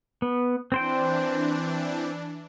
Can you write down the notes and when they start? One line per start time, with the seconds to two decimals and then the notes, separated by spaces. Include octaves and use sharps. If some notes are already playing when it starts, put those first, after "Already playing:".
0.22 B3
0.72 E3 C4 D4 C5 G5